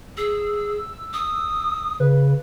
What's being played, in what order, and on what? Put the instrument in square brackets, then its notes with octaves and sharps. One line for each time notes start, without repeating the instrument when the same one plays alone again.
[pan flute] G#4 [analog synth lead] E6
[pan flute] D#6
[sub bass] C#3 [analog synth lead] B4